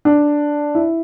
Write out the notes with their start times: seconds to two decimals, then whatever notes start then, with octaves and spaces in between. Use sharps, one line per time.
0.05 D4
0.75 E4